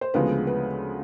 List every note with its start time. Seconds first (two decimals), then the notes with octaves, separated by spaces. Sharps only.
0.01 C5
0.14 D2 C#3 F3 G#3 B3 B4
0.47 B4